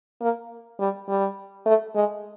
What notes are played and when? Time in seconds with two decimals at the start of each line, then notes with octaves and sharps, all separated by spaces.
0.21 A#3
0.80 G3
1.08 G3
1.66 A3
1.95 G#3